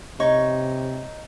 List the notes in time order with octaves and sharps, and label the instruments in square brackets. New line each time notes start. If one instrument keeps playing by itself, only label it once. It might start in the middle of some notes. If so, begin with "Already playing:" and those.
[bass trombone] C3 [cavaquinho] D#4 C#5 C#6